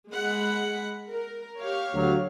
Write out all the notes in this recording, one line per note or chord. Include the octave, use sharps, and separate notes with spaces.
G#3 F#5 B5
A#4
G4 C#5 F5
D2 F#3 F#4